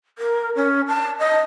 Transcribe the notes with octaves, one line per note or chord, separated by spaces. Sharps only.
A#4
C#4
A5
D#5